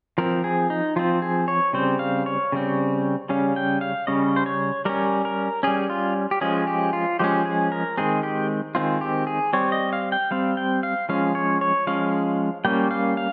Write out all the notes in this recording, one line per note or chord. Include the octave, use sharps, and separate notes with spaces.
F3 C4 A#4
G#4
D#4
F3 C4 F4
G#4
C#5
C#3 G3 C4 C5
F5
C#5
C#3 G3 C4
C#3 G3 C#4 F5
G5
F5
C#3 G3 C#4 D#5
C5
C#5
G3 C#4 A#4
A#4
G3 C#4 G#4
F4
G4
F3 G#3 C#4 G#4
G4
F4
F3 G#3 C#4 G4
G#4
A#4
D#3 G#3 C4 G#4
G4
D#3 G#3 C4 F4
G4
G#4
G3 C4 C#5
D#5
F5
G5
G3 C4 F5
G5
F5
F3 G#3 C#4 F5
C#5
C#5
F3 G#3 C#4 F5
G3 A#3 C#4 G5
F5
F5